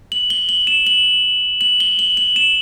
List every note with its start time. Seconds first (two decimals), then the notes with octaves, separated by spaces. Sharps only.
0.12 F#7
0.30 G7
0.49 F#7
0.67 E7
0.87 F#7
1.61 F#7
1.80 G7
1.99 F#7
2.17 F#7
2.36 E7